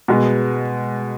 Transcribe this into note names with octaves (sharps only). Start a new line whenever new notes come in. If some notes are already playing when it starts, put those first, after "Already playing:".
B2 G#3 B3